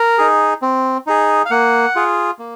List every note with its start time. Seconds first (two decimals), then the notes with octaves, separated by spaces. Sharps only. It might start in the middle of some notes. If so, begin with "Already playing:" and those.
Already playing: A#4
0.18 D#4 G#4
0.62 C4
1.07 D#4 G#4
1.45 F5
1.51 A#3 F#5
1.96 F4 G#4
2.39 A#3